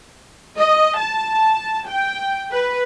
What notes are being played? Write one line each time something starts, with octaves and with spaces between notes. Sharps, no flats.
D#5
A5
G5
B4